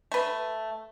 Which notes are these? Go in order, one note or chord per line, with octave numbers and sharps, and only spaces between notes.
A3 B4